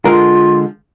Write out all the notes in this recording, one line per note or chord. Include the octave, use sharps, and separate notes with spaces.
D3 G#3 F4 A#4